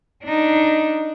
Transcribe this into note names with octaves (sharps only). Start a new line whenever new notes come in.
D4 D#4